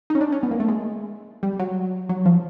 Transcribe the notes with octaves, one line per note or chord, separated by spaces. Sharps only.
C#4 D#4
D4
C#4
B3
A#3
A3
G#3
G3
F#3
F#3
F3